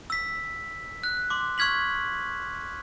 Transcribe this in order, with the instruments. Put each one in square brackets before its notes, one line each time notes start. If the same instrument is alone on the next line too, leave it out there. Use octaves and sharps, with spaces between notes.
[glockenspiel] E6 B6
F#6
C6 D6
C#6 F6 G#6 B6 F#7